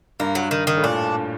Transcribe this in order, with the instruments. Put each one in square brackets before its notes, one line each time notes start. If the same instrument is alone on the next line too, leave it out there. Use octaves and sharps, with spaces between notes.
[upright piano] G2 [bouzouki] A#3
[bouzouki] F#3
D#3
D#3
[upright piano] A2
[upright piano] A#2 [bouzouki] D4